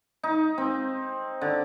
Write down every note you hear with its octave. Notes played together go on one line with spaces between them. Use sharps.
D#4
C4
D3